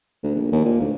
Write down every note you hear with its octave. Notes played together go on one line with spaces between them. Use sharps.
D2
A#1
D#2
A#2
D2